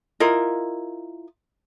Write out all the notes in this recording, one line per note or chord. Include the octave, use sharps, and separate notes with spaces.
E4 F4 A#4 D#5